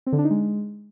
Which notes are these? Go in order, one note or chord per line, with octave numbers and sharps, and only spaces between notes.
C4
D3
D4
D#4
G#3